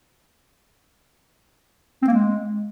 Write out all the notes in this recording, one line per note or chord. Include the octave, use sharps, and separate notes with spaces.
C4
A#3
G#3